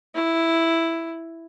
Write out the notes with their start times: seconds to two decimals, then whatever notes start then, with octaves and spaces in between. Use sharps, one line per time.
0.15 E4